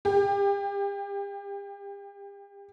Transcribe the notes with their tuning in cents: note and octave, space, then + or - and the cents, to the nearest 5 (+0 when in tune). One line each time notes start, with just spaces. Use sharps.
G4 +30